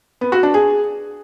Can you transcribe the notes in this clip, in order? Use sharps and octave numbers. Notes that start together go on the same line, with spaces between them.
B3
F#4
D4
G#4